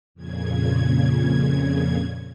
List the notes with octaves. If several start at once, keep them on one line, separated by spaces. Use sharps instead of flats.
F2 A#2 C#3 G#6